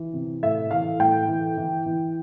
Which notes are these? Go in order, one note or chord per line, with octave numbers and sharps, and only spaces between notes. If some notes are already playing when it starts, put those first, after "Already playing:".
Already playing: E3
C3
A2 E5
E3 F5
A2 G5
E3
E3
E3